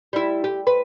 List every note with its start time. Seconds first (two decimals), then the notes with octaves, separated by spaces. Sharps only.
0.13 G3 E4
0.44 G4
0.67 B4